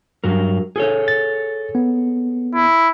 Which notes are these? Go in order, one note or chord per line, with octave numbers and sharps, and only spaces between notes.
G2 F#3 A#4
G#4 A4 C#5
A6
B3
E4